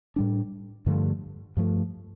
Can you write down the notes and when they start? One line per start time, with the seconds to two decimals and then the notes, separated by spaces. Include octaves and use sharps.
0.16 A2 G3 D4
0.86 G2 D3 F3 A3
1.57 G2 F3 A3